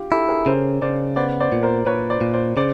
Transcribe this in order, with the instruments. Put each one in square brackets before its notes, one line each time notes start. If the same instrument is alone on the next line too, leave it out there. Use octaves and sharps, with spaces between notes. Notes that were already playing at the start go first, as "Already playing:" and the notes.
Already playing: [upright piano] F4 G4
[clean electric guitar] E4 [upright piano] G4 A4
[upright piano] G#4 A#4
[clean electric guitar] C#3 [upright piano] A#4 C5
[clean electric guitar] C#3 [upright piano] C5 D5
[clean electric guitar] B3 [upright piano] C5 D5
[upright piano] C5 D5
[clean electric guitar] A#2
[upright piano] A#4 C5
[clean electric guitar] A#2 [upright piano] B4 C#5
[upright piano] C5 D5
[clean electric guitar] A#2
[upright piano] C5 D5
[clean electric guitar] C#3 [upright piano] C5 D5